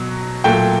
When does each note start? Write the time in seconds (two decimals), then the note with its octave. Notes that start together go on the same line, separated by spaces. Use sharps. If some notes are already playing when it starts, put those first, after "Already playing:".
Already playing: B2 F#3
0.44 A#2 F#3 A3 G5